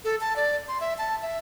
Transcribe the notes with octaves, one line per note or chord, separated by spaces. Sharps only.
A4
A5
D5
C6
E5
A5
E5